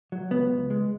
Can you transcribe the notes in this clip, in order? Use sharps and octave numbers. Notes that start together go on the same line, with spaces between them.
F#3
C#2 B3
C#2
G#3